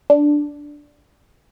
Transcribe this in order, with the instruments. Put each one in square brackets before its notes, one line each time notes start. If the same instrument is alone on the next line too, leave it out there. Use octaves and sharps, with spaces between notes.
[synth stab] D4